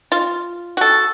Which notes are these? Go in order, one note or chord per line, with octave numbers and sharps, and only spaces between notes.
F4
F#4 A4